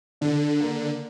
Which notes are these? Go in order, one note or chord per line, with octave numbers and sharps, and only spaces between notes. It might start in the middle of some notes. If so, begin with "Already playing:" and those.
D3 D4
A#3